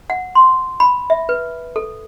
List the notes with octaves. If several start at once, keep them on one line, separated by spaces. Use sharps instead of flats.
F#5
C6
B5
E5
B4
A4